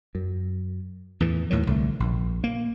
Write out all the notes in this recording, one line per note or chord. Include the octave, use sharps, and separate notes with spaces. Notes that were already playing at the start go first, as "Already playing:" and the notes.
F#2
E2 A2 E3
D#2 A2 D#3 F#3
C2 D3 A3
A#1
A#3